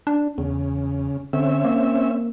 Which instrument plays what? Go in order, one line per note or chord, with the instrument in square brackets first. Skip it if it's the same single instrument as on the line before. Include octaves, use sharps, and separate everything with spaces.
[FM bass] D4
[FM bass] E2 [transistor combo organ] C#3
[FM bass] D3 [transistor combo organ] C4 C#4 E5
[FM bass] A#3